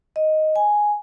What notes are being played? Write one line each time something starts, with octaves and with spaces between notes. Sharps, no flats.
D#5
G#5